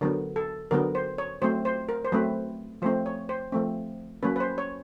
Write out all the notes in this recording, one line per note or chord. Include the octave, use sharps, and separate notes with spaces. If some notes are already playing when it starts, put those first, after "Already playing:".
D3 F#3 B3 A#4
A4
D3 F#3 B3 A#4
C5
C#5
F#3 A3 C4 C5
C5
A#4
C5
F#3 A3 C4 B4
F3 A3 C4 C5
C#5
C5
F3 A3 C4
F#3 A#3 C#4 B4
B4
C5
C#5